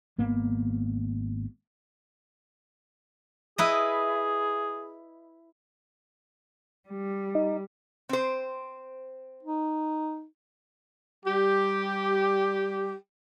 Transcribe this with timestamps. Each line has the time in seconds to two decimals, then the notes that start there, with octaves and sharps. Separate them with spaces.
0.18 G#1 A#3 B3
3.58 E4 G#4 B4 D#5
6.89 G3
7.35 D#4
8.09 C4 C5
9.43 D#4
11.25 G3 G4